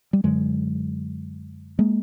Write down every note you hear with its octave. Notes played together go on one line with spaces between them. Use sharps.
G3
F#2 D3 F#3 G#3
G#3 A#3